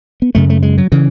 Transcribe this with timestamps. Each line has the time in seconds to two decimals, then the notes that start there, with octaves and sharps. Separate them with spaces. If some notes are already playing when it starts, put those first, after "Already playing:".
0.22 B3
0.35 F#2 C#3 A3
0.50 A3
0.63 G#3
0.78 F#3
0.92 C#3 E3